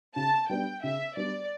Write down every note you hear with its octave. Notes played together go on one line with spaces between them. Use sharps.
C#3 A5
G3 B3 D4 G5
C#3 E5
G3 B3 D4 D5